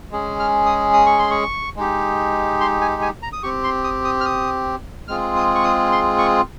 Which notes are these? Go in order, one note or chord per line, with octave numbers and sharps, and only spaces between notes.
G#3 C#4 G#4
F6
D#6
D#6
C#6
C6
C#6
G#3 D#4 G4
C6
G#5
G#5
A#5
D#6
C4 G4 C#6
C6
D#6
D#6
F6
D#6
G#3 C4 F4 G#4 F6
D#6
C#6
D#6
C6
C#6